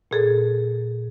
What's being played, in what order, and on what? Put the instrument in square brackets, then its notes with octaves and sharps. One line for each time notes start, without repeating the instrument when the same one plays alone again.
[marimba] A#2 G#4 A4